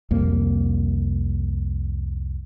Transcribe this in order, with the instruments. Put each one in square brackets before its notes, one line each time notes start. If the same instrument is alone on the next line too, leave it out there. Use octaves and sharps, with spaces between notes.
[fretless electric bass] C2 F2 A#3